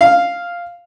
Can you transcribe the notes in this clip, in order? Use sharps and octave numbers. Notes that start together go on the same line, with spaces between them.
F5